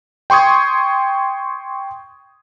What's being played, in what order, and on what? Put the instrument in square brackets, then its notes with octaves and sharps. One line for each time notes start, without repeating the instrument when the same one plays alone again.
[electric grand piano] G5 C6 C#6 D#6 G#6